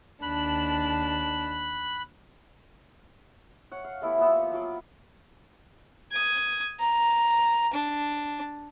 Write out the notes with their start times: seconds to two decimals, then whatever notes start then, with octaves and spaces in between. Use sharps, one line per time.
0.23 D#2 D4 A5 B5 F#6
3.72 C#5 F#5
3.84 F5
4.02 A3 B3 E4 G4
4.18 F3 A#3 B3 E6
4.52 F#3 F4 D6
6.12 D#6 G#6
6.80 A#5
7.73 D4